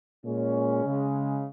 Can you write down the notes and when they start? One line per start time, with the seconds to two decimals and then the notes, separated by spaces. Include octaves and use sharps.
0.25 A#2 G#3 C#4
0.86 C#3 G#3